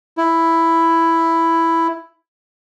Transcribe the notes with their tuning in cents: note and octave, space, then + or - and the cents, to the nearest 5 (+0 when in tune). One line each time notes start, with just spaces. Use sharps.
E4 +5